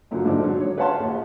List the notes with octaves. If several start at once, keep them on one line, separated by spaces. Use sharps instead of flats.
F#2 A#2 D3 F#3
G#2 D3 F3 D4 D#4
F#3
C#5
B4 C#5 F5 F#5 A5 C6
A#1 D#2